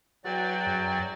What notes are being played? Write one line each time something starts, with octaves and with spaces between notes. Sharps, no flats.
E2 F#3 F#4 D5 G5
F#2